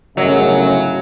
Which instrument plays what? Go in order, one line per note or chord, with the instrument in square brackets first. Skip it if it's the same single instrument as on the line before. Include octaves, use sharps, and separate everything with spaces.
[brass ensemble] G1 A2 C#3 [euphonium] F#2 [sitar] F#3 [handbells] D#5